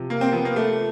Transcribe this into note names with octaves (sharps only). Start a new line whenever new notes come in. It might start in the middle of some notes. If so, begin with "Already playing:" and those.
Already playing: C3 F3
A#3
C4
F3 B3
A#3
A3